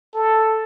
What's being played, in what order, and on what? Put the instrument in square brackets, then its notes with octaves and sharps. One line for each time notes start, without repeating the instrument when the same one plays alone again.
[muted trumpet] A4